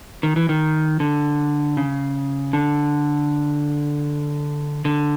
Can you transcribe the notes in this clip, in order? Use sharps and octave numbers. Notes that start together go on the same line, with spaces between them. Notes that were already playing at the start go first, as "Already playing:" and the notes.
D#3
E3
D#3
D3
C#3
D3
D3